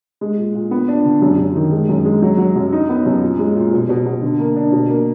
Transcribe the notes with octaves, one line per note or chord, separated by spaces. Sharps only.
G#3
A#2
A#2
B3
D4
D3
F#2
F#2
D#3
G#3
F#2
G#3
F#3
F#3
F#2
D#4
B3
F#2
A#2
G#3
A#2
B2
B2
B2
D3
A#3
D4
B2
A#3